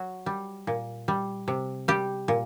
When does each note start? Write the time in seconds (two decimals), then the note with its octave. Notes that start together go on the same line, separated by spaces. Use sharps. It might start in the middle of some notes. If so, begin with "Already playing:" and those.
Already playing: F#3 F#4
0.26 G3
0.67 A#2
1.08 G3
1.48 C3
1.88 G3 G4
2.28 A#2